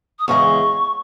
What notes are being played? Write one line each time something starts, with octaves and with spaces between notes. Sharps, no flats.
D#6
E2 C#3 G#3 C#6